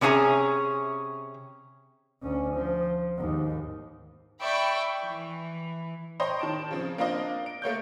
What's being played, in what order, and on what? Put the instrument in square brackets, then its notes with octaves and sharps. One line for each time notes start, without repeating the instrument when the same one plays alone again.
[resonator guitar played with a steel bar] C3 C#4 D4 G#4 E5 A#5
[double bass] D2 C#4
F3
D#2 G#2
[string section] D5 E5 G5 B5 C#6
E3
[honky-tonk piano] C5 C#5 D#5 G5 A#5 C6
D#3 A5 D7
C#3 F3 C4
A#3 C4 D4 F4 A#4 D#5
D7
A3 A#3 C#5 G6